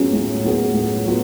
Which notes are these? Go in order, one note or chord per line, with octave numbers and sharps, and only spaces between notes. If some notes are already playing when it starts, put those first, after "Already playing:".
Already playing: A2 F#3 B3 C#4 F4 G#4
A2
F#3 B3 F4 G#4
A2
F#3 B3 F4